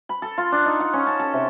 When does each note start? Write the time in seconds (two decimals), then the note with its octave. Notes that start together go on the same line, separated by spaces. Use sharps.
0.09 B5
0.22 A4
0.38 F4
0.52 D4
0.66 D#4
0.80 F#5
0.93 C#4
1.07 A5
1.19 A4
1.33 C3